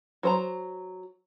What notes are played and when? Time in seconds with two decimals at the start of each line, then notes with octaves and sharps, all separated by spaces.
0.23 F#3 C5 A#5